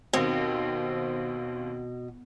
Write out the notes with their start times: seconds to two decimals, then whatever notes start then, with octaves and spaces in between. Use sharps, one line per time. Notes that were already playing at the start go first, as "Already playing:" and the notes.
0.13 D#2 B2 C4